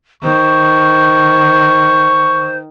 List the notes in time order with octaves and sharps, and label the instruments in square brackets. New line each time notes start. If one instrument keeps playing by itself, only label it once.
[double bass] D#3 [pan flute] C5 [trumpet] C#6